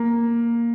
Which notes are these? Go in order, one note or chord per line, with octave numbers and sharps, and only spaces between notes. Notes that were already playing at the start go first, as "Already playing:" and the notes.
Already playing: A#3